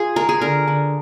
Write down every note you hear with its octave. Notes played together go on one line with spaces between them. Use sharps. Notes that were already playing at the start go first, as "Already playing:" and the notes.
Already playing: F4 G#4
G#3 A#4
G#4
D3 A#4
D3